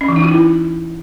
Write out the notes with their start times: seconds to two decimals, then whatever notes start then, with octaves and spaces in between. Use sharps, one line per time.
0.01 C#4
0.08 E3
0.16 D#4
0.24 F4
0.31 E4